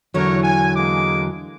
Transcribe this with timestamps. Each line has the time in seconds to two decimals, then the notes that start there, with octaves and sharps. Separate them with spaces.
0.14 E2 D3 F#3 A#4 C#5
0.43 G#5
0.75 G#3 A#3 D6